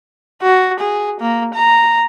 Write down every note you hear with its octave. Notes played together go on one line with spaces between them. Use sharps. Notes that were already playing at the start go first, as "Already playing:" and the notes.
F#4
G#4
A#3
A#5